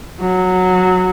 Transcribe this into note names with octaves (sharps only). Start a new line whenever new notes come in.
F#3